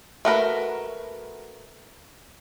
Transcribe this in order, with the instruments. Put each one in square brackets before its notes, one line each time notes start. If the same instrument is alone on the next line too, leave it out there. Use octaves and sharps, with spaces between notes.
[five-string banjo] A3 F#4 A#4 B4